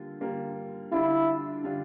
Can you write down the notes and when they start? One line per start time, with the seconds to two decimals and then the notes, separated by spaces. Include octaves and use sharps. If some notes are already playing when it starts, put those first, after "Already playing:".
Already playing: D3 G3 A#3 F4
0.21 D3 G3 A#3 F4
0.92 D3 G3 D4 E4 F4
1.63 D3 G3 D4 F4